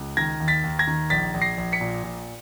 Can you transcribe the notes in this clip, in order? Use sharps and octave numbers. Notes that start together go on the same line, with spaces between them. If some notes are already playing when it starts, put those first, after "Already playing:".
Already playing: C#2
D#3 G#6 A#6
D#2
A6 B6
D#2
G#6 A#6
D#3
A#1 A6 B6
A#1
A#6 C7
A#1
B6 C#7
A#2
A#2